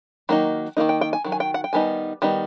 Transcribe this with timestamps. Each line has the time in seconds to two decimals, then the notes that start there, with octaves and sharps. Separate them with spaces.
0.29 D#3 F#3 A#3 D#4
0.77 D#3 F#3 A#3 D#4
0.89 G5
1.01 G5
1.13 G#5
1.24 D#3 F#3
1.32 G#5
1.40 G5
1.54 F#5
1.64 G5
1.73 D#3 G3 B3 D#4 G#5
2.22 D#3 G3 B3 D#4